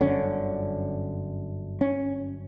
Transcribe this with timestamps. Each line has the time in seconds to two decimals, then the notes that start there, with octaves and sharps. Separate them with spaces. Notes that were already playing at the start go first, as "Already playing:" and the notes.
0.01 G1 F#2 D3 C#4
1.81 C#4